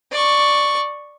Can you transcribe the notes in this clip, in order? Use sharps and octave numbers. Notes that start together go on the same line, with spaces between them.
D5 C#6